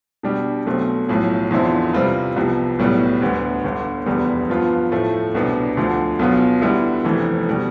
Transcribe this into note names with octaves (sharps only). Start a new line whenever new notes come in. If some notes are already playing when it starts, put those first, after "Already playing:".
B2 G3 D4 G4
B1 B2 A3 C4
B1 A2 F3
E2 D3 F3 C4 E4
C3 G3 C4 F4 B4
C2 C3 F3 B3
B1 A2 G3 B3
D2 D3 G3 B3
G1 G2 D3
F1 E2 D3 G3 B3
G2 F3 B3 F4
A2 F3 A3
C2 B2 B3 D4
D2 D3 F3
B1 B2 B3 F4
D3 G3 B3 E4
F1 F2 E3 A3
B2 G3